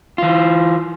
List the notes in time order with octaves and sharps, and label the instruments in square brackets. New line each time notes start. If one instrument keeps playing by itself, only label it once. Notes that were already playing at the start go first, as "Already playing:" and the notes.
[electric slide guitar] E3 F4